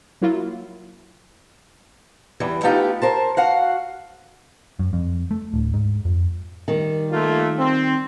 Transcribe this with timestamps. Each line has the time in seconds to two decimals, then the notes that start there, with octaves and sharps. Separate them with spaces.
0.22 F#3 A#3 E4 F4
2.40 E2 E3 G3
2.63 A3 B3 D#4 F4 G4
3.02 A#4 C5 A5
3.37 F#4 F5 F#5
4.79 F#2
4.93 F2
5.31 A3
5.54 D1
5.74 G#2
6.05 F2
6.68 D#3 G3
7.12 A3 A#3 F4
7.58 C4